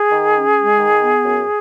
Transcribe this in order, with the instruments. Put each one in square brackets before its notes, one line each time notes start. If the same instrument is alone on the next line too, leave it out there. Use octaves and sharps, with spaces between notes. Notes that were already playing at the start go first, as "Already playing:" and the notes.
Already playing: [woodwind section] G#4
D#3
C#4
G#3
D#3
B3
F#2